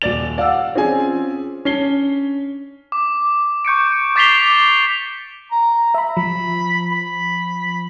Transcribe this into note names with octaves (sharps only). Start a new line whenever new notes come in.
D#1 D5 A6 F7
D5 F5 F#5 E6
C4 C#4 F4 G#4 G#5
C#4 D4 C7 G7
D6
C#6 G6 C#7 D7
D6 A6 B6 C7 F7 G7
A#5
E5 A#5 B5
F3 B5
B5